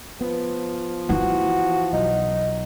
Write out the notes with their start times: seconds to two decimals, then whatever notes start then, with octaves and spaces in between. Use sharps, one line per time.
0.21 F3 B3
1.09 E3 E4 F#4
1.93 B1 D#4